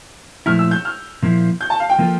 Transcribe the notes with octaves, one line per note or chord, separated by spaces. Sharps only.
A#2 F3 A3 E4 F6
E6
G6
F6
A#2 F3 A#3 E4
G6
A5
F5
G5
F3 A#3 F4 A4